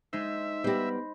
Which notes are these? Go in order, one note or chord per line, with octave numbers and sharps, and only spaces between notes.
G#3 D#4 C5 E5
G3 B3 G4 C5 B5 A#6